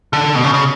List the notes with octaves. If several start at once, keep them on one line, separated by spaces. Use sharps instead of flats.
D3
B2
C#3
C#3